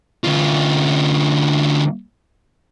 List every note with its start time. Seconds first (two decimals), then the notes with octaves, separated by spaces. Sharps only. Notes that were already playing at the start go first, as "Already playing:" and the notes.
0.25 D2 F4